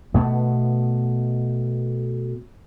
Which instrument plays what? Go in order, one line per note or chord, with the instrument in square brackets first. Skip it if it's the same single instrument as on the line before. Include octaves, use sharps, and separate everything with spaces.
[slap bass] B2 A3 B3